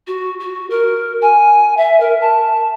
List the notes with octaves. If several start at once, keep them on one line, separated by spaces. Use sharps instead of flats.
F#4
F#4
A#4
G#5
E5
A#4
A5